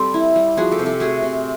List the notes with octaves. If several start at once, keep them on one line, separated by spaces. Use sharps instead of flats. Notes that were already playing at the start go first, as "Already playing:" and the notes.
Already playing: G3 C4 G4 A4
E4
G3
F3 F#4 G#4
G4 A4
C3
G4 A4
A3 F#4 G#4
C3